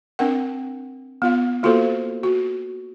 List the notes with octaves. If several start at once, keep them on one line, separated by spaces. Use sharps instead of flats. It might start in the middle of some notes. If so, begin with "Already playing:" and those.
C4 D4 A#4 F#5
B3 F4 F5
A#3 F4 F#4 A4 C5
F#4